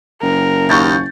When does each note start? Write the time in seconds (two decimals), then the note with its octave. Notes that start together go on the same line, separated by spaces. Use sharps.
0.22 F#1 A#4
0.70 D#2 C#6 G6 A6